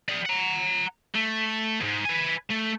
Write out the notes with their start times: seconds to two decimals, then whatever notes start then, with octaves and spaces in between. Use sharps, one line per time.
0.09 G#4 D5
0.26 F#5 A#5
1.15 A3
1.80 E2 G#2
2.05 B4 G#5
2.51 A3